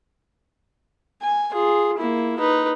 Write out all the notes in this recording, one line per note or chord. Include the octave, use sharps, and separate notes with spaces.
G#5
F4 G#4
A#3 E4
D#4 B4